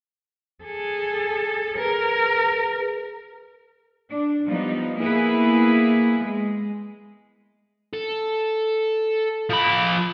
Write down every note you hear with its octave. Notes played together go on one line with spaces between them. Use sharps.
G#4 A4
G#4 A#4 B4
D4
F3 G3 B3 D#4
A#3 B3 E4 G#4 B4
G#3
A4
F3 B5